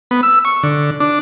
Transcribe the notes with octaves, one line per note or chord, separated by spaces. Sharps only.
B3
E6
C#6
D3
D4